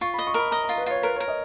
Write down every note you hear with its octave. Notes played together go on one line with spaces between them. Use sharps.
F4 C#6
B5
D#5
C#6
A#4 B5
D#5 A#5
A#5
F4
B4
F4 C#5
A#4 B4
C#5
A#4
D#5